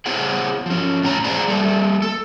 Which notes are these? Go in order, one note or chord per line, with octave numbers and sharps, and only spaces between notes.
B3 E4 G#4 C5 C#5 F#5
F3 C#4
E2 A2 C#4 D#4 A#5
G#4 C5 D5 F#5 A#5
G3 A3 A#3 A4
A4